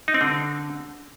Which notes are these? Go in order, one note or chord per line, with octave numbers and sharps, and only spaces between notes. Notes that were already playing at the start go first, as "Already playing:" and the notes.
D#4
C4
D3